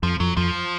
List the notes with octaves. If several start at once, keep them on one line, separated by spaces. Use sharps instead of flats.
F2 F3
F2 F#3
F2 F3